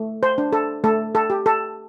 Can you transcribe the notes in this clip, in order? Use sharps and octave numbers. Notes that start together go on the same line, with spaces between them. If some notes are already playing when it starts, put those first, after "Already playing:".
Already playing: A3
C5
D4
A4
A3 A4
A4
G4
A4